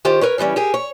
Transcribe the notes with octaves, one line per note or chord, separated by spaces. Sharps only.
D#3 F4 G4 C5
A#4 B4 C#5
C#3 E3 G3 C#4
G4 G#4 A#4
C#5